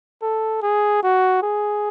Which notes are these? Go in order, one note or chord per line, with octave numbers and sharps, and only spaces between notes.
A4
G#4
F#4
G#4